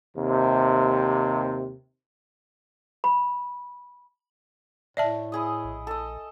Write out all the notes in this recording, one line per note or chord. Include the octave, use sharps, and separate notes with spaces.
D#2 C3
B5
A2 D5 E5 A5
E4 G#4 D#5
A#1
A4 D#5